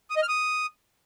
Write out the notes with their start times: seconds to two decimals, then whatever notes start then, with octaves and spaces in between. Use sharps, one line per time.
0.10 D#6
0.16 D#5
0.22 F6
0.28 D#6